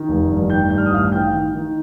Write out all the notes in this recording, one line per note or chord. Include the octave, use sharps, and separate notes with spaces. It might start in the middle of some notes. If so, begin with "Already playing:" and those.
Already playing: D#3
F1
G2
D#3 G5 G6
G2 G6
F6
D#6
A1 F5 F6
D#3 G5 G6
D#3
D#3